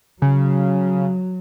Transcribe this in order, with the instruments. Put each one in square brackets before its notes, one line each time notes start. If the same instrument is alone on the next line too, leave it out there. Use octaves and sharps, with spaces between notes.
[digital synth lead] C#3 [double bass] F#3